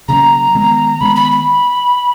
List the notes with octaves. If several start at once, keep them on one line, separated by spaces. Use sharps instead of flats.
C#3 F#3 A#3 C#4 A#5
D#3 G#3 B3
D#3 G#3 B3 B5
B5
B5